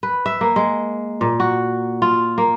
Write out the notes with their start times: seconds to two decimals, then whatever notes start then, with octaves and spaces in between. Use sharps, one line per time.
0.03 B4
0.26 E5
0.41 A#3
0.56 G#3
1.21 A#2
1.40 F#4
2.02 F4
2.38 A#3